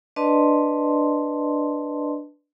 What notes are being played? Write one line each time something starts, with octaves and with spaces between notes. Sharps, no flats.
D4 B4 D5 D#5 A5 C6